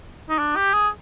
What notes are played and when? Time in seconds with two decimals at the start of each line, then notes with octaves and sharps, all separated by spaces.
0.30 D#4
0.39 D4
0.56 G4
0.74 G#4